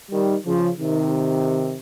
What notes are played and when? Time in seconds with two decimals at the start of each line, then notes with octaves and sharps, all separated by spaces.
0.11 D#3 G3
0.46 C#3 F3
0.80 C3 D#3